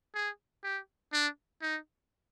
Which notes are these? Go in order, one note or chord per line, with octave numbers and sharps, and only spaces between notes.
G#4
G4
D4
D#4